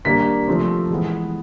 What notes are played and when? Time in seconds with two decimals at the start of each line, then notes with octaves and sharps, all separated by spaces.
0.05 D#3 G3 A#3 D4 B6
0.47 C3 F3 A3 C4
0.90 E3 G#3 B3